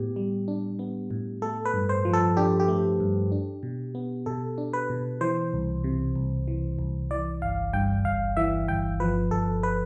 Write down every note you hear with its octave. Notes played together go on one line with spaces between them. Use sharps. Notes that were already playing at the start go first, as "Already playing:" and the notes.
Already playing: A2 B3 G4
G3
D4
B3
A2
A3 A4
B4
G2
C5
F3
A4
D4 G4
G4
A3
G2
D4
B2
B3
B2 A4
D4
B4
B2
E3 C5
C2
C3
C2
E3
C2
E3 D5
G1 F5
G2 G5
G1 F5
E3 E5
G1 G5
F3 B4
G1 A4
B4